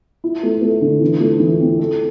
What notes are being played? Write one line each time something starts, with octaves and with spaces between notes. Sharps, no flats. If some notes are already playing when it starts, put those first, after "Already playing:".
E4
A3
A3
D3
E3
A3
E3
C4
A4